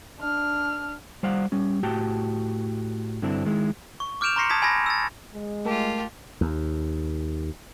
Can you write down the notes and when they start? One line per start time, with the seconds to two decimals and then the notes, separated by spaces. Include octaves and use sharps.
0.19 D4 F6
1.23 G3 C5 D5 F5 F#5
1.52 G3 C#4
1.83 A2 F#4 G4 G5 A5
3.22 G2 D3 C4 D4 E4
3.45 D#3 G#3 E4
4.00 C#6
4.21 D6 F6 G6 D7 E7 F7
4.36 A#5 C6 C#6 A#6 C7 C#7
4.50 A5 D#6 G#6 A6 B6
4.62 G#5 B5 E6 G#6 A#6
4.86 E6 A6
5.32 G#3
5.65 A3 F4 G4 A#4 A5
6.41 D#2